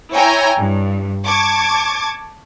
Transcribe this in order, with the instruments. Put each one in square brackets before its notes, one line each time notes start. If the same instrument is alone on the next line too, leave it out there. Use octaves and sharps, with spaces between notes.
[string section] E4 C#5 G5 G#5 A#5
G2
A5 C#6 D6 G#6